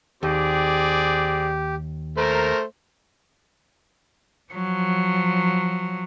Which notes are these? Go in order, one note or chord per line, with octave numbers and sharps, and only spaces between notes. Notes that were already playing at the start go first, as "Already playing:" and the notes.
D#2 C4 G4 G#4 D5
A3 A#4 C5
F3 F#3